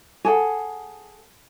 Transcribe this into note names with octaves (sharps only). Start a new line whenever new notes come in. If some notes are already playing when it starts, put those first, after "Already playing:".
G#4 A4 F#5